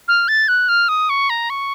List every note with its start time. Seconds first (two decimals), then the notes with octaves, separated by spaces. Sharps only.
0.08 F6
0.28 A6
0.48 F#6
0.69 F6
0.89 D#6
1.10 C#6
1.30 A#5
1.50 C#6